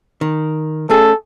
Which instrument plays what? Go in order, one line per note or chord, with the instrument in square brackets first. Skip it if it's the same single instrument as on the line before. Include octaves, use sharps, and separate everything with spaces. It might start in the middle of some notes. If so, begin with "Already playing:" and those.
[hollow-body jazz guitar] D#3
[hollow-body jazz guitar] A3 C#4 G#4 [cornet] A4